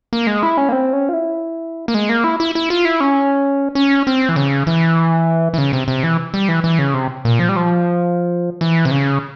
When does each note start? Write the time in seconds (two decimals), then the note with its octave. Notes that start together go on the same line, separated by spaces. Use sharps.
0.13 A#3
0.27 G#3
0.43 E4
0.57 C#4
0.69 A#3
0.72 C4
0.93 C#4
1.09 F4
1.13 E4
1.88 A#3
1.94 G#3
2.09 A#3
2.24 E4
2.40 E4
2.55 E4
2.70 F4
2.85 E4
3.00 C#4
3.75 C#4
4.07 C4
4.29 E3
4.36 C#3
4.67 E3
5.54 E3
5.58 C#3
5.73 C3
5.88 C3
6.03 E3
6.34 G3
6.49 E3
6.64 E3
6.79 C#3
6.94 C3
7.25 A#2
7.39 F3
7.49 G3
7.56 F3
8.61 E3
8.85 C3
8.91 C#3